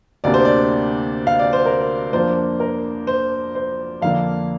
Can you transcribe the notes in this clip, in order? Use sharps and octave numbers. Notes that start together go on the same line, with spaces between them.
D2 C3 A#3 D4 D5
C5
D5
F5
D5
C5
A#4
F2 F3 A#3 D4 C5
A#4
C5
C5
F2 D3 A#3 D4 F5